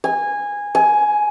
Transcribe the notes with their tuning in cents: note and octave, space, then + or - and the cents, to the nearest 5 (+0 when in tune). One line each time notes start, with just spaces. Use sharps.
G#5 -15
G#5 +15